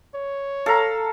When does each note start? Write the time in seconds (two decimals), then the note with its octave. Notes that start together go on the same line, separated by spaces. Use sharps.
0.15 C#5
0.66 A4 F5 A#5